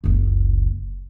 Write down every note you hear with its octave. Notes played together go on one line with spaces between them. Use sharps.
F#1 C#2